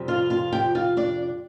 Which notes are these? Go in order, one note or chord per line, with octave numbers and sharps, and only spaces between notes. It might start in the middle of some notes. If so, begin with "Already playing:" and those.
Already playing: F2 C3 G3 C4
F4 F5
F4 F5
G4 G5
F4 F5
D4 D5